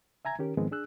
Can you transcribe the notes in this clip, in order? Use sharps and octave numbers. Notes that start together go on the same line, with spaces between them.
E5 G#5 A#5 G#6
D#3 C#4 G4 A#4
G#2 D#3 F3 G#3 B3 C4
D4 G#4 E6 F#6